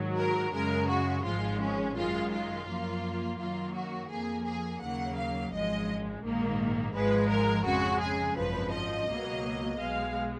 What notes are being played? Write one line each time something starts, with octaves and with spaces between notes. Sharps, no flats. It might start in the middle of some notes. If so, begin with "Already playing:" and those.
Already playing: G#2 D#3 F#3
A#4
F#2 C#3 G#3 A#4
F#4
G#1 G#2 F3 G#3 F4
C#4
F#2 D#3 G#3 F4
F4
F#2 F3 A#3
F#2 D#3 F#3 A#3 F4
F#4
F2 F3 A#3 G#4
G#4
D#2 C#3 F#3 A#3 F#5
F5
G#1 F#2 F3 G#3 D#5
A#1 G#2 D#3 A#3
G#1 G#2 F3 G#3 B4
A#4
F2 C#3 G#3 F#4
G#4
G#1 F#2 F3 B4
D#5
C#2 B2 F#3 A#3
B1 B2 G#3 F5